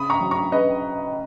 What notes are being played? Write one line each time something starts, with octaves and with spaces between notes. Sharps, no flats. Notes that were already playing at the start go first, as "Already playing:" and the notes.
Already playing: C#3 B5 D#6
A#5 C#6
F#3
A#5 C#6
C#3 B4 D#5